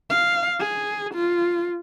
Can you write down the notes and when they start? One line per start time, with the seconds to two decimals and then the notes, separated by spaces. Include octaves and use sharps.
0.10 F5
0.60 G#4
1.14 F4